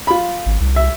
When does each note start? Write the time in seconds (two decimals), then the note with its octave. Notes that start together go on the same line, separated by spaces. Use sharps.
0.07 F4 B5
0.46 G#1
0.60 C2
0.76 E5